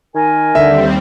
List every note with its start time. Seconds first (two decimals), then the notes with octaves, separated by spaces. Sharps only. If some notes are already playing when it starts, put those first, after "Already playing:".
0.15 D#3 A#4 G#5
0.55 D#2 D3 G3 C4 E5